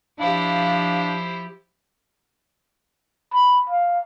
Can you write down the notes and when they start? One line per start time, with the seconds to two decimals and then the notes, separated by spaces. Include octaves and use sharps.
0.19 F3 D4 E4 G4 C5 F5
3.33 B5
3.69 F5